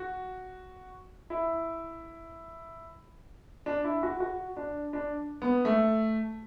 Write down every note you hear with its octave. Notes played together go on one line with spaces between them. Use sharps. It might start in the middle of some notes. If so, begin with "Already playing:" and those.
Already playing: F#4
E4
D4
E4
F#4
F#4
D4
D4
B3
A3